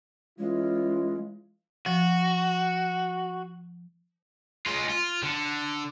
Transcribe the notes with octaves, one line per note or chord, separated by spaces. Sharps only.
E3 G#3 C#4 F4
F3 F#4
G#3 F4
F4
D3